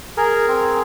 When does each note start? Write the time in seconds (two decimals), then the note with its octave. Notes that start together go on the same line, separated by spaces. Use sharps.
0.17 G#4 A#4
0.48 C4